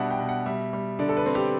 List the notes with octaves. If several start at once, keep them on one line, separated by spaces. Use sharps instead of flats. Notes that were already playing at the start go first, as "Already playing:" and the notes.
Already playing: B2 G3 D4 E5 F#5
G5
B2
F#5
G3 E5
G3
D3 D5
A4
B4
C4
G4